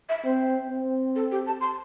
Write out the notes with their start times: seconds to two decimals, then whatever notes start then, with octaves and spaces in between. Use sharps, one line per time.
0.09 E5
0.25 C4 C5
0.70 C4
1.15 A4
1.31 G4
1.47 A5
1.61 C6